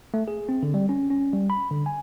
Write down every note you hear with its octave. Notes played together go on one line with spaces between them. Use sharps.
A3
G#4
C4
D3
G3
C#4
C#4
G3
B5
D3
G#5